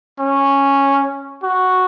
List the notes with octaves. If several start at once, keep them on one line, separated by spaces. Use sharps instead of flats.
C#4
F#4